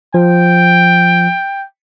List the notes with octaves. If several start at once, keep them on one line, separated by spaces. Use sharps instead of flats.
F3 G5